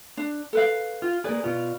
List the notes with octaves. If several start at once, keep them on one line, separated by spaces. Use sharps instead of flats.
D4
A4 B4 F5
F4
A#3 G#4 B4 D5
B2 F4